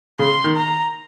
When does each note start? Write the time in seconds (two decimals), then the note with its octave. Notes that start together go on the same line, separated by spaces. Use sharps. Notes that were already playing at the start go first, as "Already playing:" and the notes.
0.19 C#3 C6
0.44 D#3
0.56 A#5